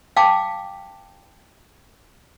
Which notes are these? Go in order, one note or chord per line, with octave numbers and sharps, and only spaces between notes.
F5 G5 A5 D6